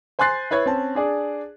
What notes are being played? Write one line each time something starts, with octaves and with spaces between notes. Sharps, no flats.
C5 G#5 C6 F#6 A6 C7
E4 B4 C#5 G#6
C4 C#4 A5
D4 G#4 D5